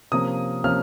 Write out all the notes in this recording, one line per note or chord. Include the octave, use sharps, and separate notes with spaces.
C3 F3 A#3 C#4 D#6
C3 F3 A#3 C#4 F6